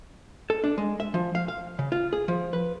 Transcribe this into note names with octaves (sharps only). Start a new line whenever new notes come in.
A4
D4
G#3
E5
F3
F5
F5
C#3
F4
G#4
F3
B4